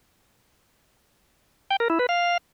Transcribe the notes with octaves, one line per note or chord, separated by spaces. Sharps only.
G5
A#4
E4
B4
F5